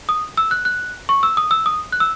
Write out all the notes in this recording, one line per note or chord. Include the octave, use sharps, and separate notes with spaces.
D#6
E6
F#6
F#6
C#6
E6
D#6
E6
D#6
F#6
E6